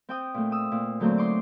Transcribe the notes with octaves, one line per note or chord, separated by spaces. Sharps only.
C4 G5 D#6
A#2 A3
D#6 E6
A#2
D3 F#3 A3 A#3 C4
D#4 C6 D6